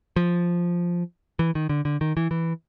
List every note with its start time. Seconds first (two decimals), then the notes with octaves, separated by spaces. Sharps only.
0.16 F3
1.39 E3
1.55 D#3
1.69 D3
1.85 D3
2.01 D#3
2.17 E3
2.31 E3